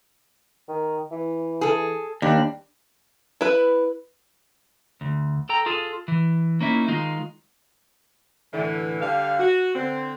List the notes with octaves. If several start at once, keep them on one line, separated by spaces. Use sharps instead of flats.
D#3
E3
G#4 A4
D#2 G3 D4
E4 B4
D2
A4 G5 A#5
F4 G#4 A4
E3
A#3 C#4 D#4 E4
D#3 G#3 D#4 F4
A2 D3 E3
D3 G3 F5
F#4
D3 C4